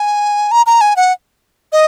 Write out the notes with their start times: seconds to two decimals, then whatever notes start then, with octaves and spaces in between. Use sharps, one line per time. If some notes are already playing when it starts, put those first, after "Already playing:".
Already playing: G#5
0.51 A#5
0.66 A#5
0.81 G#5
0.96 F#5
1.72 D#5